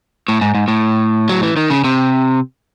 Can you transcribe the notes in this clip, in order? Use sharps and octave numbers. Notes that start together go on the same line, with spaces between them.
A2
G#2
G#2
A2
F#3
E3
D#3
C#3
C3